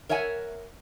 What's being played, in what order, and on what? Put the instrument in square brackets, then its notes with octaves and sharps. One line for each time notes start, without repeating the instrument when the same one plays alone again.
[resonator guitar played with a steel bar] A#4 C#5 E5 F#5 G#5